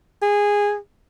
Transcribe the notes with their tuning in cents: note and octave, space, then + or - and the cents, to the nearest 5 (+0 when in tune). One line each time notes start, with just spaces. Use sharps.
G#4 -15